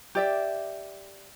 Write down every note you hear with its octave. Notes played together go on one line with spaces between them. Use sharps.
G4 D5 E5